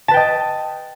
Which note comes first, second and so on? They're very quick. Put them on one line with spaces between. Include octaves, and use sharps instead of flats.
A5 B4 G5 D#5